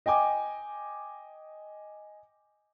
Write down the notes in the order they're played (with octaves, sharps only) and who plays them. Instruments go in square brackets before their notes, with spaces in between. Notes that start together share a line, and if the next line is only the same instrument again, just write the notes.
[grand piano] D#5 G5 G#5 D6